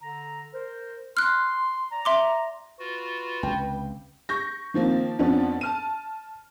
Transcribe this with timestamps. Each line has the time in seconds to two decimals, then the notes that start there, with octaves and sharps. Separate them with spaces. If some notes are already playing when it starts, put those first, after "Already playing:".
0.02 D3 A#5
0.53 A#4 C5
1.17 C6 F6 F#6
1.92 D5 A#5
2.05 E5 C6 D6
2.79 F4 F#4 B4
3.43 C#2 C3 G5
4.29 C#6 G6 A#6
4.74 D#3 F3 A#3 C4
5.19 F2 F3 B3 C#4 D4
5.61 A5 F6 D#7